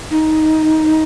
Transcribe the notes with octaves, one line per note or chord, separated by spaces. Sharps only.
D#4